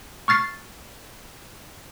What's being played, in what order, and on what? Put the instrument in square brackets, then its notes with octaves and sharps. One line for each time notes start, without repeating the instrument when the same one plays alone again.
[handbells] C#6 F6 A6 C7